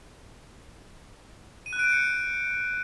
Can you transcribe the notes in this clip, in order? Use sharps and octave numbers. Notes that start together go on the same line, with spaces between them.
D#7
F#6
D7
G6
C#7